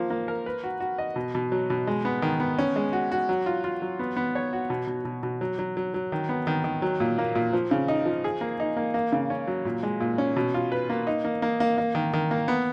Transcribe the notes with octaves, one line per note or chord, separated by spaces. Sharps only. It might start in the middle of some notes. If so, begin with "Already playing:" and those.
Already playing: F3 A#3
A#3
A#4
B4
F#4
F#4
D#5
B2
B2
F#3
B2
G#3
B3
D#3
B3
C#4
G#3
F#4
F#4
F#3
F4
F4
F#3
B3
B3
C#5
F#4
B2
B2
B2
B2
F#3
F#3
F#3
F#3
D#3
B3
D#3
D#3
F#3
A#2
A#3
A#2
F3
C#3
D#4
F3
G#4
A#3
D#4
A#3
A#3
C#3
C#4
F#3
A#2
G#3
A#2
C#4
B2
F4
B4
A#3
D#4
A#3
A#3
A#3
A#3
D#3
D#3
A#3
B3